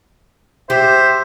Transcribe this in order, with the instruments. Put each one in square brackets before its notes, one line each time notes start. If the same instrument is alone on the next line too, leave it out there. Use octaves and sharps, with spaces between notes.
[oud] G4 [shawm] C5 [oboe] E5